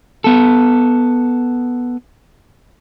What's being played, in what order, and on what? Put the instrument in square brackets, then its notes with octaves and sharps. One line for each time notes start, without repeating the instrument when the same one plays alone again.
[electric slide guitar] B3 A4